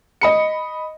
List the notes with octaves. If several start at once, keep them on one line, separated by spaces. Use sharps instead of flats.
D#5 B5 C#7